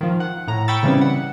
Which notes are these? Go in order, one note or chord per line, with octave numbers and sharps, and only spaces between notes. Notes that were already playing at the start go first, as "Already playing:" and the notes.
D#3 F3
F#5
A2 A#5
G5 B5 C#6 E6 A6
C#3 E3 G3 C4 C#4
F#5